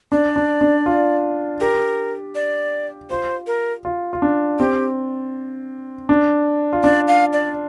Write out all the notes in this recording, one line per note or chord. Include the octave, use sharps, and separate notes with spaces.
D4 D5
D4
D4
F4
G4 A#4
D5
F4 C5
A#4
F4
F4
D4
C4 G4
D4
F4
D4 D5
F5
D5